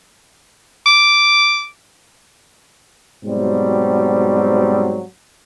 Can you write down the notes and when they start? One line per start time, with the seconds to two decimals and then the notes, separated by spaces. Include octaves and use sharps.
0.86 D6
3.25 G#2 B2 F#3 G3 C4